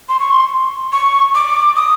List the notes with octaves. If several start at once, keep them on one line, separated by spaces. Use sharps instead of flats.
C6
C#6
C6
C#6
D6
D#6